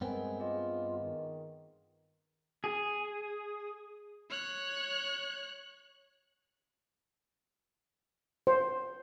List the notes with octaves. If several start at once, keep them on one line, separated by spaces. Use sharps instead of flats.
G2 G#3 B3 C4 A#4 G5 G#5
F4 G#4 D#5
D#3
G#4
C#5 F#6
C5